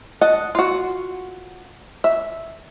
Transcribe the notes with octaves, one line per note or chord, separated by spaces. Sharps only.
D#5 F#5 A5
F4 F#4
E5